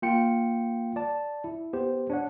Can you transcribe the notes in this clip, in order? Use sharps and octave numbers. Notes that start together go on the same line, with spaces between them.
A#3 F4 G5 C#7
D5 A5
E4
B3 G4 C5
D4 C#5 F#5